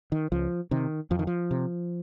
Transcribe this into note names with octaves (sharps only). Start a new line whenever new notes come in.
D#3
C#2 F3
C3 D#3
F2 F3
D#3
F3
C3